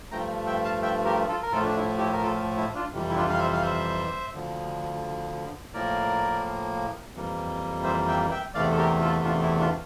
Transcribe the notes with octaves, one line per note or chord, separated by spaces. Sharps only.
G2 F3 A3 G5 A#5
E5 G5
F5 A5
E5 G5
G4 A#4
F4 A4
A#4
A2 F3 A3 F4 A4
D4
E4
E4 G4
A#4
F4 A4
E4
D4 F4
F2 C3 E3 G3
E4
D4 F4
F5
C5 E5
F5
C5 E5
D2 D3 F3
A2 F3 A#3 A#4 D5
F2 E3 G3 A#3
C5 E5
E5 G5
E5 G5
E2 C3 E3 A3 D5 F5
A4
G4 A#4
F4 A4
D4 F4
E4
D4 F4